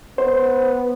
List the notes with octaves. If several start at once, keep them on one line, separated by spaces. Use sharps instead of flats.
B3 C5